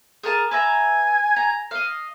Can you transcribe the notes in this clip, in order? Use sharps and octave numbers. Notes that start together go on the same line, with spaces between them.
G#4 A#4 A5
B4 E5 G#5 A#5
A#5
D#5 F5